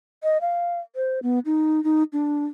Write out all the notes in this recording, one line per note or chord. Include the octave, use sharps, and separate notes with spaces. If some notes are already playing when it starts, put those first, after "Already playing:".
D#5
F5
C5
B3
D#4
D#4
D4